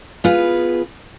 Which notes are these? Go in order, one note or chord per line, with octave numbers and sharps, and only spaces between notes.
B3 F4 G#4 B4